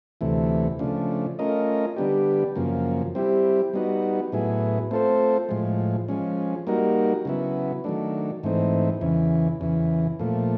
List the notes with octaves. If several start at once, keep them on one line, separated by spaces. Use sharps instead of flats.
D2 C3 E3 A3
C#3 F3 A3 D4
A3 C#4 F4 A#4 D#5
D3 G3 B3 D4 G4
F#2 C#3 F3 A#3
G3 C4 E4 G4
G3 B3 D#4 F#4
A2 F#3 B3 E4 G#4
A3 C4 F4 A4 C5
A2 F3 G#3
F3 G#3 C#4
G3 A#3 D#4 F#4 A#4
C#3 F#3 B3 E4
D#3 F#3 A3 D4
G#2 E3 A3 C4 D#4
E2 C#3 E3
E2 C#3 E3
A#2 F3 A3